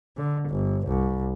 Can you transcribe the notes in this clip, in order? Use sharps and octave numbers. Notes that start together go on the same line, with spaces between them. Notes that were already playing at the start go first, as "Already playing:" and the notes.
D3
G1
C2